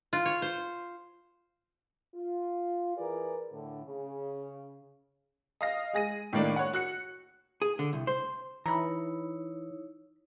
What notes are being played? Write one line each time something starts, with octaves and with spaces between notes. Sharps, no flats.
F4
C#5
C5
F4
E3 G#4 A#4 B4 D5
A2 D3
C#3
D#5 F5 A#6
G#3 G#4 A#6 D#7
A2 D#3 A#3 D4
C#5 F#5
F#4 F#6 C#7
G#4
D3
C2
C5
E3 D#4 E4 C#5 A#5 B5